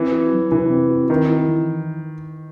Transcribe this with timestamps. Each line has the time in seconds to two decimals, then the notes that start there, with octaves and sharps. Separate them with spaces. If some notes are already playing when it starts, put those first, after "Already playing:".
Already playing: E3 C4
0.12 F#4
0.32 F#3
0.52 C3 E3
0.70 C4
0.90 F#4
1.10 D#3 C4
1.29 E4
1.48 E3